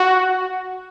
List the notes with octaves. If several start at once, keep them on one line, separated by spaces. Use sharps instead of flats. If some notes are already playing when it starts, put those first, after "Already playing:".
Already playing: F#4